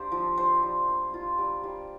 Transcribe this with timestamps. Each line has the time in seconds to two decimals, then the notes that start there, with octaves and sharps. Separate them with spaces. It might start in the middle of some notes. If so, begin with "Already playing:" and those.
Already playing: A#3 D4 G4 C5
0.12 F3
0.38 G3 C5
0.63 G3
0.88 A#3
1.14 F4
1.38 G3
1.63 G3